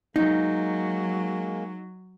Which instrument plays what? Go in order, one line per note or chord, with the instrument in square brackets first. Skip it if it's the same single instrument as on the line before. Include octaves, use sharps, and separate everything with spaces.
[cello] F#3 [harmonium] G#3 A#3 [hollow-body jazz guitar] D#4